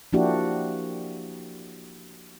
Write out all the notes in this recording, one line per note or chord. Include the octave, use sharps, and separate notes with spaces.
F3 A#3 D4 E4 F#4 G4